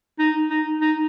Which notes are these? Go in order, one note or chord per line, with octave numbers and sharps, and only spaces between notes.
D#4
D#4
D#4